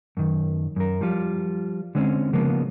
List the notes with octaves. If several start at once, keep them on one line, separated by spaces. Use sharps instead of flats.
F#2 D#3
F#2 A#4
F3 G3 F4
D3 G#3 C4 C#4
C#3 F3 G#3 A#3 B3